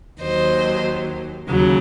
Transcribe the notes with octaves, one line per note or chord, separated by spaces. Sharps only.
D#2 D#3 F#3 C5 D#5
D#2 C#3 F#3